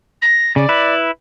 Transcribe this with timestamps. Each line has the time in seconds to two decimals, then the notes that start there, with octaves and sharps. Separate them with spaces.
0.22 A#6
0.56 C#3 D5
0.69 E4 B4